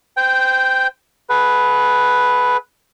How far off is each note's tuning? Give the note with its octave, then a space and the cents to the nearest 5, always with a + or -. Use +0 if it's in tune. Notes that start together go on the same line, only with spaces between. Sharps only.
C5 -25 G5 +0
G#4 +35 B4 +0 F#5 +0